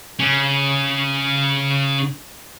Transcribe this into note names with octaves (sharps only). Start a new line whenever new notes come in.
C#3 C#4